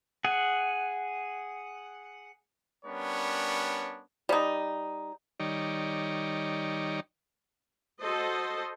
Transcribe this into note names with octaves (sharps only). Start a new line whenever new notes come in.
G#4 F#5
G3 B3 C#4 D4 A#4 C#5
G3 D#4
D#3 G3 D#4 C#5 D5
F#4 A4 C5 D#5